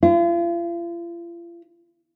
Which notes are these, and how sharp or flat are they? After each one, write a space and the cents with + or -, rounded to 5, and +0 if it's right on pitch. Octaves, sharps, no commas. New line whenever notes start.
F4 -40